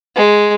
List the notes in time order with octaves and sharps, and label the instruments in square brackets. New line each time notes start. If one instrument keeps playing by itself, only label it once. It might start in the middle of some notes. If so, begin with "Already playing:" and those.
[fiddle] G#3